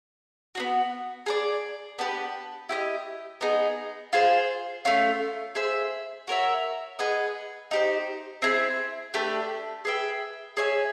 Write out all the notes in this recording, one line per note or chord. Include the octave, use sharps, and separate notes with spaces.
B3 D4 F#4
G#4 B4 D5
B3 D4 G4 B4
E4 G4 C5 D#5
B3 D#4 G#4
F4 G#4 C5
A3 C#4 F4
G#4 C5 E5
F#4 A#4 C#5 E5
G#4 B4 D#5 F#5
D#4 G4 C5
C4 E4 G#4
A3 D4 G4 B4
G#4 B4 E5 G5
G#4 C#5 E5 G#5